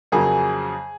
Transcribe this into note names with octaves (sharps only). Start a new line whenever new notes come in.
F2 C#3 F#3 A#3 G#4